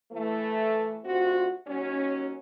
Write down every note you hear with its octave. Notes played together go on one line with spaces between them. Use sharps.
E3 A3
D2 C3 C4 F4 F#4
D#2 F#3 C#4